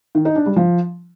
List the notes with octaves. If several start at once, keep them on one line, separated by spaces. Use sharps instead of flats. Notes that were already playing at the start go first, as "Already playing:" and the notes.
D#3
D#4
D4
G3
F3